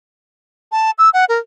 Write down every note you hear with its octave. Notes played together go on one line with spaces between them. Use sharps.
A5
E6
F#5
A#4